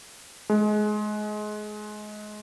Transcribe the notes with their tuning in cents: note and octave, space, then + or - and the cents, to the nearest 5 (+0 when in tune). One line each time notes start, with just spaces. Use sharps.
G#3 +25